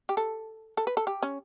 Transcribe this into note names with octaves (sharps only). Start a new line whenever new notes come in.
G4
A4
A4
B4
A4
G4
C#4